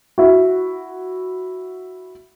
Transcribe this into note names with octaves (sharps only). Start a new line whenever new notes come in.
E4 F#4